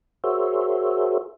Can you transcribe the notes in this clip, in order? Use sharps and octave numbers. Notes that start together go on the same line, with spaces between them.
F#4 G#4 A#4 C5 C#5 E5